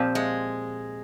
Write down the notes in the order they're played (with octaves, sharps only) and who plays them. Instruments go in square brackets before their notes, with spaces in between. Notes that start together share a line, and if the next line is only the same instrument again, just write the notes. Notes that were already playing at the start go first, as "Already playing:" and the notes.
Already playing: [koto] A#2 F3 C4 G4
[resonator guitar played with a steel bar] G#3